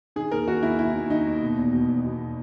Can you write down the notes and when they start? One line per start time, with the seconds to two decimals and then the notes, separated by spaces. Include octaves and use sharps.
0.16 D#3 G#4
0.32 D#2 A#4
0.48 D#3 F#4
0.63 D#2 E4
0.79 D#3 E4
0.95 D#2
1.10 D#3 D#4
1.27 D#2
1.42 B2
1.58 E2
1.73 B2
1.89 E2
2.04 B2